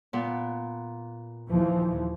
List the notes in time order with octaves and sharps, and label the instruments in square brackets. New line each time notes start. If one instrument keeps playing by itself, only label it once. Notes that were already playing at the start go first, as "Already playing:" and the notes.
[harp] A#2 B3
[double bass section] D#2 E3 F3